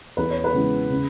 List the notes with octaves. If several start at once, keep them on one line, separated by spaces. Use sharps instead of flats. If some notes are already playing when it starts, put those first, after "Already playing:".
E2 B4
C#5
B4
C#3 E3 G#3 B3
C#3